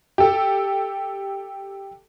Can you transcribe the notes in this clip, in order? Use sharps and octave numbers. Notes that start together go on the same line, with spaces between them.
G4 A4